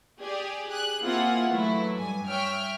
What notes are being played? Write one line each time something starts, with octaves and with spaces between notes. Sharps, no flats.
G4 G#4 D5
G#4 F#6
A#3 C4 E4 F4 G#4 F#5
E3 F#3 A3 E4
G2 G#5
C#5 E5 G5 F6